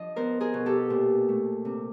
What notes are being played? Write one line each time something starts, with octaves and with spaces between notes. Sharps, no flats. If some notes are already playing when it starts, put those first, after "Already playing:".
Already playing: F3 D4 D#5
B3 A#4 C5
G#4 A#4
B2
G4 A4
A#2
A3
C3